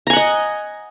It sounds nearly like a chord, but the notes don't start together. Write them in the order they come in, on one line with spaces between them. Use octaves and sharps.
A#5 G#5 F#5 D#5